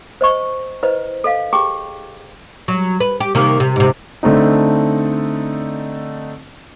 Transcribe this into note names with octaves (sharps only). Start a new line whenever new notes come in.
C5 D#5 C#6
E4 B4 C5 D#5
A4 D#5 F5
G4 G#4 G5 A#5 D6
F#3
B4
G4
C3 D#3 A#3
C3
G#2 C3
D3 A3 C4 D#4